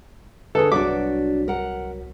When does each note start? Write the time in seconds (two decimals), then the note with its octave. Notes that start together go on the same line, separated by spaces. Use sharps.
0.55 D3 G#4 A4 B4 C#5
0.72 C2 F#3 D4 F#4 D6 B6
1.48 A#4 F#5